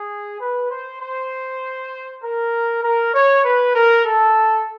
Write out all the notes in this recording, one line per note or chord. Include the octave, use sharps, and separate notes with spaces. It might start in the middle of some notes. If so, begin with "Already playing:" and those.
Already playing: G#4
B4
C5
C5
A#4
A#4
C#5
B4
A#4
A4